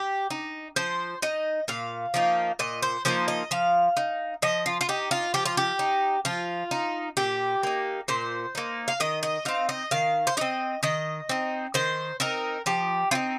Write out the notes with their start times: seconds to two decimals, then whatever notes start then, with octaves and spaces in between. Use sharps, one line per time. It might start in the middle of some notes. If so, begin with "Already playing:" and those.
Already playing: G4
0.30 D#4
0.76 F3 C5
1.22 D#4 D#5
1.68 A#2 F5
2.14 F3 A#3 D#4
2.59 A#2 D#5
2.83 C5
3.05 F3 A#3 D#4 C5
3.28 D#5
3.51 F3 F5
3.97 D#4
4.42 F3 D#5
4.66 F4
4.81 F4
4.89 D#4 G4
5.11 F4
5.34 F3 G4
5.46 F4
5.57 G4
5.79 D#4
6.25 F3 F4
6.71 D#4
7.17 A#2 G4
7.63 A#3 D#4
8.08 A#2 C5
8.55 A#3 D#4
8.88 F5
9.00 D#3 D#5
9.23 D#5
9.45 C4 D#4 F5
9.69 D#5
9.91 D#3 F5
10.27 C5
10.37 C4 D#4 D#5
10.83 D#3 D#5
11.29 C4 D#4
11.74 D#3 C5
12.20 C4 D#4 A#4
12.66 F3 G4
13.11 C4 D#4 F4